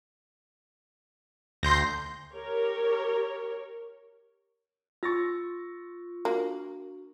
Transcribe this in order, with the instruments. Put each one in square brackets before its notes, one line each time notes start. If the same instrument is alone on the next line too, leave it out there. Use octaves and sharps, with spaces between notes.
[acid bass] D2 [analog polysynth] C6 G6 A#6
[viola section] G4 A#4 C#5
[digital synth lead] F4 [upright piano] C#6 A6 A#6 [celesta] E6
[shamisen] A#3 [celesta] D4 F#4 F#7